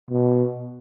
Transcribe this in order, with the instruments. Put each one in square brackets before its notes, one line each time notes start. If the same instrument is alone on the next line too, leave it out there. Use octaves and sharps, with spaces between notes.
[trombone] B2